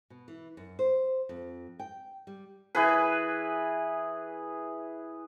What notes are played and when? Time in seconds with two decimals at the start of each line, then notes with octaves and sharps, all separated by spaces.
0.10 B2
0.28 E3
0.57 F#2
0.79 C5
1.29 F2
1.79 G5
2.27 G3
2.75 E3 G#4 B4